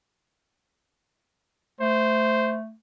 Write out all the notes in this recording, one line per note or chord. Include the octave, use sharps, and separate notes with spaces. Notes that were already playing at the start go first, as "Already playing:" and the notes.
A3 C5